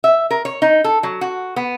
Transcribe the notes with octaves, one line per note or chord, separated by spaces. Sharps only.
E5
A#4
C#5
D#4
A4
F#3
F#4
B3